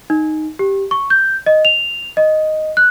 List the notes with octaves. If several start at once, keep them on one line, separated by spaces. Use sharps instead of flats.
D#4
G4
C#6
G6
D#5
F7
D#5
F#6